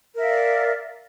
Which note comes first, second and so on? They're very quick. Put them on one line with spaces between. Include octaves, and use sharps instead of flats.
A#4 E5 F5 D5